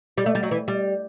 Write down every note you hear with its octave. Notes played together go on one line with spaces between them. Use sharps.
G3
A3
G3
F#3
E3
G3